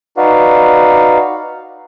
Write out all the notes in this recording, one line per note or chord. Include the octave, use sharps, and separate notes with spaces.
D#4 F#4 B4 D5 F5 F#5